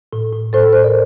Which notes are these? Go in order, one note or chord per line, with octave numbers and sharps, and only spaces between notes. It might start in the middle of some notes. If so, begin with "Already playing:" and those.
A2
A2
A2 A4 C5
A2 C5
A#4 D5